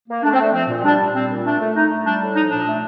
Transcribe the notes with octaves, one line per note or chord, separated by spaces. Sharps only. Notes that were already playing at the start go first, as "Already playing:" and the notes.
A#3
A3 D4
C4
A3 D4
F3 C4
A#2
G3 D4
A#2
G3 C4
A#2
A3 D4
A3
A3 D#4
A3
G3 D4
A2
F3 D#4
A#2 D4
A3